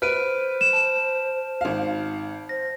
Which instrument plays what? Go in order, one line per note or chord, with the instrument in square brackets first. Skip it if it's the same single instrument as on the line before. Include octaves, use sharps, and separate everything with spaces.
[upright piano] B4 [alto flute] C5 [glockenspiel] F6 D7 D#7
[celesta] E7
[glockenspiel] A5
[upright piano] G#1 F5
[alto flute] C5 [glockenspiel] A#6